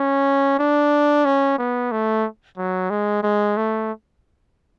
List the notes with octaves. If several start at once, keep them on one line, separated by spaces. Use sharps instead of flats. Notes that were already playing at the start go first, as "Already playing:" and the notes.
Already playing: C#4
D4
C#4
B3
A3
F#3
G#3
G#3
A3